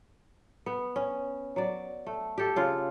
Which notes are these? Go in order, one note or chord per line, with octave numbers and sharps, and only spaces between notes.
B3
C#4
F#3 D5
A3
G4 A4
C#3 F4